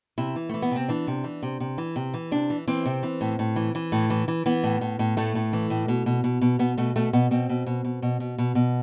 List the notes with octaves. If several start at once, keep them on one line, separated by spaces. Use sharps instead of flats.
C3 E4
E3
E3 A3
B3
C3 C4
E3 D4
C3
E3
C3
C3
E3
C3
E3
C3 D4
E3
E3 C4
C3
E3
A2
A2
E3
E3
A2
E3
E3
E3 B3
A2
A2
A2
A2 A3
A2
E3
A2
B2
B2
B2
B2
B2 B3
B2 A3
B2 A3
B2 B3
B2 C4
B2
B2
B2
B2
B2
B2
B2